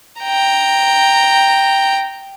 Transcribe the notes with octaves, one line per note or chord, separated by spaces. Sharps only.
G5 A#5